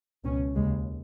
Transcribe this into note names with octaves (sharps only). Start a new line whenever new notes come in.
C#2 B2 C#4
D#2 C#3 G#3